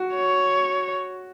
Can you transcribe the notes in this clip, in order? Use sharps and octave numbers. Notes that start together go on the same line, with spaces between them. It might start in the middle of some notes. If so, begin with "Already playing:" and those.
Already playing: F#4
C#5